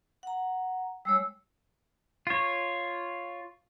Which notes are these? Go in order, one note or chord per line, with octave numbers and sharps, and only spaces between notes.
F#5 A#5
G3 G#3 C#5 E6
F4 C#5